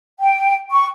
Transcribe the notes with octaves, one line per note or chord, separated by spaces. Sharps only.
G5
C#6